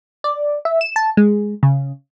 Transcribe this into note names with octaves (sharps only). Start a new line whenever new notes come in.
D5
E5
E7
A5
G#3
C#3